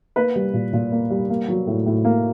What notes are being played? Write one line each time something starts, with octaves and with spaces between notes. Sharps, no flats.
A#3 B4
G3
A#2
A#2
A#3
G3
A#3
F#3
A2
A2
A#3